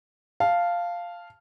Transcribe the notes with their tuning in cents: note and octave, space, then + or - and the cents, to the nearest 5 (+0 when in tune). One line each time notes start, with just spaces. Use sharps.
F5 -5 A5 +0